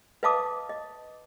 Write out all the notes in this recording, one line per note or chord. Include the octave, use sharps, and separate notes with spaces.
B4 D#5 F5 A5 D6 D#6
D#5